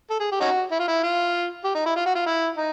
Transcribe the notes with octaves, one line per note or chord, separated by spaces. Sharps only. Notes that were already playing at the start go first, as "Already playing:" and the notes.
A4
G#4
G4
C#4 D#4 F#4
E4
F4
E4
F4
G4
D#4
E4
F4
F#4
F4
E4
D#4